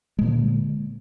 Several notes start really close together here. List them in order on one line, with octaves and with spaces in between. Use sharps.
G#3 A#2 A#3 D3